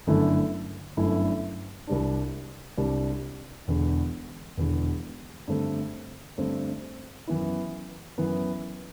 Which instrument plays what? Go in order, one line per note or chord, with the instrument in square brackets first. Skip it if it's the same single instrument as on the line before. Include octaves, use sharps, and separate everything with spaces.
[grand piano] G1 F#2 D3 A3 E4
G1 F#2 D3 A3 E4
C2 C3 G3 D4
C2 C3 G3 D4
E1 E2 D3
E1 E2 D3
G2 D3 A3 C4
G2 D3 A3 C4
F#2 E3 B3 E4
F#2 E3 B3 E4